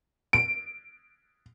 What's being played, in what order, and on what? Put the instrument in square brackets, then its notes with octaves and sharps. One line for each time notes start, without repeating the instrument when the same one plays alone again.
[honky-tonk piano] D7